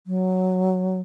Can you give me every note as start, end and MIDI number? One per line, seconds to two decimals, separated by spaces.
0.07 1.01 54